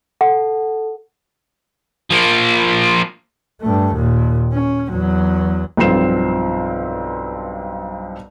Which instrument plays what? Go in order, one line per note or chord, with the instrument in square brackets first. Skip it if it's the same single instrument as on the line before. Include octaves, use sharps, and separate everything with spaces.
[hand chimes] A4 [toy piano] F#5
[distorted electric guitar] F3 A#3
[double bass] G2 A3
D#2 A#2
C#4
E2 F#3
[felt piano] B1 G2 F3 C4 C7 E7